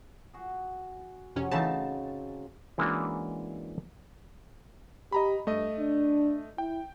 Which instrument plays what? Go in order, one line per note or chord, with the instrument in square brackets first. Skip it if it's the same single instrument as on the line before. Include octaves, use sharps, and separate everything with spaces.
[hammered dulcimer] F#4 G#4
[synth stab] F2 C3 C#4 [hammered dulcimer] F#3 C4 F#5
[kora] C#3 D#4 [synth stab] E3 A3 A5
[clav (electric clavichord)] E3 G#3 A#3 C#4 D4 F#4
[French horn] G4 [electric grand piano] D#5 A#5 B5
[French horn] G2 [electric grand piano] A3 D#5
[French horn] D4
[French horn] E4 [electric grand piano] G5